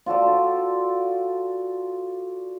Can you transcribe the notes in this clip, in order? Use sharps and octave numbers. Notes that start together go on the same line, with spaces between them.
F4 F#4 A4 D5